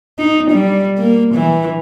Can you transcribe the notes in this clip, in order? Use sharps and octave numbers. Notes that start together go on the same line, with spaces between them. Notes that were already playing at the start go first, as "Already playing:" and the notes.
D#4
G3
A#3
E3